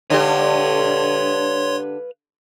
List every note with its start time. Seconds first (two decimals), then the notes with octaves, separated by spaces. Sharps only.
0.10 D3 G4 B4 C#5 F5 C6